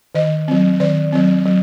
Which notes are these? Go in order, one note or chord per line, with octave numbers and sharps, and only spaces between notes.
D#3 D#5
F#3 C4
D#3 D5
F#3 C4
F#3